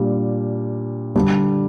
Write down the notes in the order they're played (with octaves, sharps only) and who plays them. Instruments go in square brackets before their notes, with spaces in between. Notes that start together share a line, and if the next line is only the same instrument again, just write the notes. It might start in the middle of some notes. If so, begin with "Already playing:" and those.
Already playing: [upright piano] A#2 G3 D4
D3 G3 D4